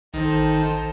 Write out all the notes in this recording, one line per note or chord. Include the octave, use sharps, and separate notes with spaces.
A1 D#3 A4 C5